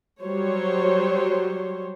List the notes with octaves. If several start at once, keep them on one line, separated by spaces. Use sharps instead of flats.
F#3 G3 C5 C#5